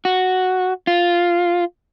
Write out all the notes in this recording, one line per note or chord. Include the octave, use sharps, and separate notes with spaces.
F#4
F4